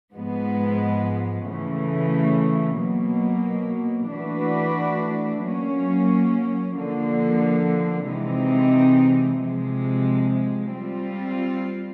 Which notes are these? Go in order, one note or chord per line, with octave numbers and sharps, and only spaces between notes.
G#2 F3 G#3 B3
C#3 E3 A3
B2 F#3 A#3
E3 A3 D4 F#4 B4
F#3 A#3 C#4
D3 F3 A#3
C3 E3 G#3 C4 D#4
C3 F3 G#3
G3 C4 F4